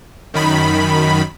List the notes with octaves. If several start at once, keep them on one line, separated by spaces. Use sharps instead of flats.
F#2 D#3 B5